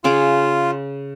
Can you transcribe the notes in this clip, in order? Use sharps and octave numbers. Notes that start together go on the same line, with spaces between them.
C#3 F4 G#4 D6